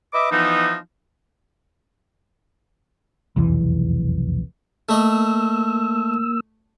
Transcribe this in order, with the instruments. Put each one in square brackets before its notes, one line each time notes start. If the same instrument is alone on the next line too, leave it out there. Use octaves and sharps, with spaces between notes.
[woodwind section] B4 D#5 E5 D6
E3 F3 B3 D#4
[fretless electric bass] F1 B1 E2 E3
[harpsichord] A3 D#5 [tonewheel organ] A#3 E6